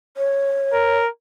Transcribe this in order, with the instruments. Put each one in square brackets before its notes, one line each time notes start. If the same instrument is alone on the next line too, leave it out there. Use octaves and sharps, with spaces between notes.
[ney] C#5
[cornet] A#4